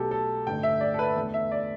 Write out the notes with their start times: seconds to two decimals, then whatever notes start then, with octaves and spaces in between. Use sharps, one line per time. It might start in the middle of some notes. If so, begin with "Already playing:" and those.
Already playing: B1 B2 A3 G4 A4
0.11 A4
0.47 A1 G2 D3 A3 G5
0.63 E5
0.81 D5
0.94 A4
0.99 B4
1.16 E2 D3 A3
1.34 E5
1.52 D5